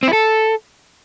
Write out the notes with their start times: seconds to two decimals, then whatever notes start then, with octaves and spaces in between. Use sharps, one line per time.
0.03 C4
0.08 E4
0.13 A4